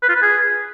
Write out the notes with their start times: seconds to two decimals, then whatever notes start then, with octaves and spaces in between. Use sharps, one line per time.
0.03 B4
0.09 F4
0.16 B4
0.22 G#4